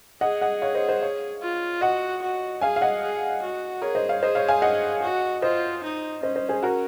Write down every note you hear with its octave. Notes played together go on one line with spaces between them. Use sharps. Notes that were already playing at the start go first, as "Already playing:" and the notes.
G#4 D#5 F#5
D#5 F#5
C#5 F5
C5 D#5
C5 D#5
C#5 F5
F4
F#4 D#5 F#5
F#4
G#4 F5 G#5
F5
D#5 F#5
G#4
F#4
G#4 A#4 C#5
C5 D#5
C#5 F5
G#4 C5 D#5
C#5 F5
F5 G#5
D#5 F#5
F#4
F4 C5 D#5
D#4
C#4 C5 D#5
C5 D#5
G#4 C5
F#4 A#4